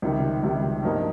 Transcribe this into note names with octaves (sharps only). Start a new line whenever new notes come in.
C#2 C3 D#3 G3
C#2 C3 D#3 G3
G2 F3 A#3 D#4